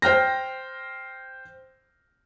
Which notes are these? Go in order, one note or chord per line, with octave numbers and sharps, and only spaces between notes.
C5 G5 F6 A#6